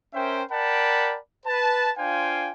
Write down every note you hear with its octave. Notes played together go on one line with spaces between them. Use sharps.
C#4 A#4 C5 E5 G5
A#4 D5 F#5 G5 A5 B5
B4 A5
D4 F4 C5 F5 G5 G#5